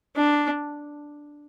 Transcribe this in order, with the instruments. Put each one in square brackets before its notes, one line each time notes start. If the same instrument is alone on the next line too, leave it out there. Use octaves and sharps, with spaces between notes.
[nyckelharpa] D4